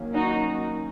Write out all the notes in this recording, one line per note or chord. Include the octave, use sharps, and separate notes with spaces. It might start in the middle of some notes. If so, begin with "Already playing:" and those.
Already playing: D#3 F#3 A#3 C#4
D#4 F#4